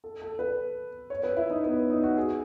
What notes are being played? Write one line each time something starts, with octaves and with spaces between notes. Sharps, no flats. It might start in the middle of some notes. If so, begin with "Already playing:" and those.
A4
A4
B4
C#5
B4
E4
D#4
B3
D#4
F#4
G#4